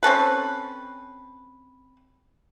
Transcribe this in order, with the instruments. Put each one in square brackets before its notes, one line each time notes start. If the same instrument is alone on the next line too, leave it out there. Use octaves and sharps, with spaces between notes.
[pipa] C4 C#4 A4 B4